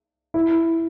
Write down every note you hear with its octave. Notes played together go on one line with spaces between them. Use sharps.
E4